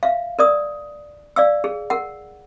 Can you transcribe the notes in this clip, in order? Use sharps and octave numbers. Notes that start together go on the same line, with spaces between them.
E5 F5
A#4 D5 D#6
D5 F5 E6
G#4
A#4 F#5